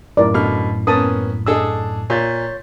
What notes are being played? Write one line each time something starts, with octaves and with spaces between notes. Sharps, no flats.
F#2 A2 E4 A#4 D5
B2 D3 F6
A#3 B3 C#4 A5 D#6
D4 G#4 A4 D#5 E6
A#2 C#5 G6 A6